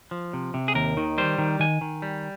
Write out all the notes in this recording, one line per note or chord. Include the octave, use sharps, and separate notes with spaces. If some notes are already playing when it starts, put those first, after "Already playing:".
F3
C3
C3
G#4
D#2 A#4
D#3
G3 C5
D#3
D#3 G#5
D#3
G3